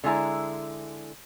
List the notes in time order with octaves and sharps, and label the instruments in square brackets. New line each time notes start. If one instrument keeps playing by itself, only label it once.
[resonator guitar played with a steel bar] D3 G#3 E4 A#5